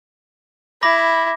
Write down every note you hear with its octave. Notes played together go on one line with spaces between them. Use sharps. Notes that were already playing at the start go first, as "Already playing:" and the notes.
E4 B5 D6 A#6